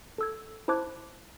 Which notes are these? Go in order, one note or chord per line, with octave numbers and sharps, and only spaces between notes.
A4 E6 G#6
E4 C5 A5 D6 F#6 G#6